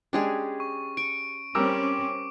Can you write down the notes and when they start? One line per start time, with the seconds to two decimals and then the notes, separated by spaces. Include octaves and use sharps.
0.13 G#3 C#4 D4 G4 G#4
0.60 C#6
0.97 C#6 D7
1.55 G3 C4 C#4 A#4 D6 E6